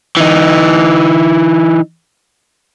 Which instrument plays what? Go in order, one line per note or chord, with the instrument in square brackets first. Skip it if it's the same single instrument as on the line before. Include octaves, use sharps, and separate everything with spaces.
[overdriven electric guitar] E3 D#4